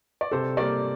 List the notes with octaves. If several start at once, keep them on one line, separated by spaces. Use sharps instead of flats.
D5
C3 A4 C5
G3 A#3 A#4 D5